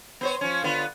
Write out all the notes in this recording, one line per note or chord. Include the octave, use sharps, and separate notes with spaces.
B3 C5 C#5
F3 C#4
D3 B3 F4